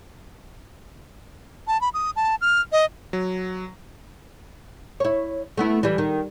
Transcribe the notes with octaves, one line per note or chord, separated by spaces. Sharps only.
A5
B5
D#6
A5
F6
D#5
F#3
E4 C#5
A3 B3 E4
E3 G3
D#3